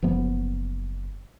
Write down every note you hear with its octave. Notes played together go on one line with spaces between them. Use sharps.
F#1 F3 B3